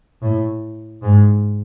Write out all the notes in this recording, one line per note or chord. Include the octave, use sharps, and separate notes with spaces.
A2
G#2